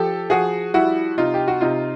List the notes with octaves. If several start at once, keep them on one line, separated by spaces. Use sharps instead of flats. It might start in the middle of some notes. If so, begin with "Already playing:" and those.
Already playing: F3 G4 A4
F3 F#4 G#4
G3 E4 F#4
C3 D#4 F4
G4
F#4
C3 D#4 F4